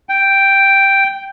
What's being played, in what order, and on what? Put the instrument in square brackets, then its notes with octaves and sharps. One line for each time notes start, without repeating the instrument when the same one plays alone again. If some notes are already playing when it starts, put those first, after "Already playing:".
[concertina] G5